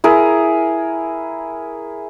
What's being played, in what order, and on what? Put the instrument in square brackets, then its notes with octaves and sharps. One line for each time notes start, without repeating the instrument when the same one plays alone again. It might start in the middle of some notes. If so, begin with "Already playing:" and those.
[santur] E4 G#4 A#4